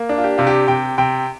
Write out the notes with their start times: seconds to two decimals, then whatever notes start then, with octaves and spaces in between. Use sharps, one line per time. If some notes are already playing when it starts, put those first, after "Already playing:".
Already playing: A#3
0.09 D4
0.18 F4
0.24 G4
0.38 C3 F4
0.47 G4
0.68 C3 G5
0.98 C3 G5